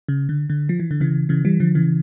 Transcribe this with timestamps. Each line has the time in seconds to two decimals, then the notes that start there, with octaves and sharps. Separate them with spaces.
0.08 C#3
0.29 D3
0.50 D3
0.69 F3
0.80 E3
0.91 D3
1.00 C#3 E3
1.29 C#3 E3
1.45 E3 G3
1.60 D3 F3
1.75 C#3 E3